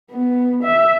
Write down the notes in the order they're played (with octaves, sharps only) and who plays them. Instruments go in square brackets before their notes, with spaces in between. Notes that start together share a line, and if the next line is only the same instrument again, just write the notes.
[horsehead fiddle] B3
E5